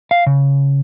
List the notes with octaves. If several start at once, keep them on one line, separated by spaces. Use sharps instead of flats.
F5
C#3